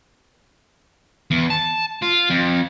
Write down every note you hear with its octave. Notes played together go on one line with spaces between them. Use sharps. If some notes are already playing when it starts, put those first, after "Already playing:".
E2
A5
F4
F2